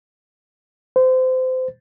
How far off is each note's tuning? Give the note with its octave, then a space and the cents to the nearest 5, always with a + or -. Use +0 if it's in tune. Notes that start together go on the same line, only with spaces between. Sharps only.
C5 -25